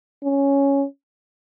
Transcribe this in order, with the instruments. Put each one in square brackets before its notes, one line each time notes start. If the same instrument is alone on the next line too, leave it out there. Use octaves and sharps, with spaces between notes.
[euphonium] C#4